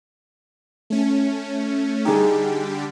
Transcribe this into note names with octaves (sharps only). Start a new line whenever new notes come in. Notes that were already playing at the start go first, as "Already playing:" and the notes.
A3 C#4
D3 G3 D#4 G4 G#4